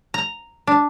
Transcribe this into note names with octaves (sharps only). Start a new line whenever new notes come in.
A#5
D4